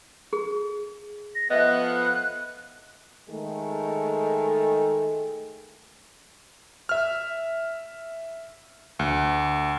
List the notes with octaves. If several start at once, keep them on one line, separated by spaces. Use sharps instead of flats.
G#4
A#6
F3 A3 B3 D#5 E5 F#6
D#3 G#3 A3
E5 F6
D2